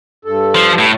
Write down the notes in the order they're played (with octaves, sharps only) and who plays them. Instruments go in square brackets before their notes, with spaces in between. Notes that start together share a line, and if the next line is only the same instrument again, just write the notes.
[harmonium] G2 A4
[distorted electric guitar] F3
A2